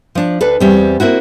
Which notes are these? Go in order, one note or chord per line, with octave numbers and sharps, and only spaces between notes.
F3 D4
D2 D4 A4 B4
E2 G3 C4
A#3 C4 E4 F#4